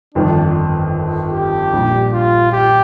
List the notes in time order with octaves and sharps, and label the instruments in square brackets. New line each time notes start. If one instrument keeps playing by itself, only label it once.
[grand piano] G1 F2 D#3 [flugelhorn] D4
[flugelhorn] G4
[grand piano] A#1 A#2 G3 D4
[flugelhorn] F4
G4